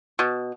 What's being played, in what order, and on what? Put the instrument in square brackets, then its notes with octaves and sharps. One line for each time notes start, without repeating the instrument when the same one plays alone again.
[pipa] B2